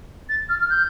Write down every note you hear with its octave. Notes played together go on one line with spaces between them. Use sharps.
A6
F6
F6
G6